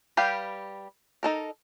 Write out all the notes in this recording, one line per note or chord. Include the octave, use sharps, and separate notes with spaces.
G3 G4 B4 F5 G5
D#4 A4 A#4